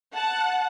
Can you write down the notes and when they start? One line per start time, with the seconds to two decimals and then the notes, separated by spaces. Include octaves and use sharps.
0.15 F#5 A5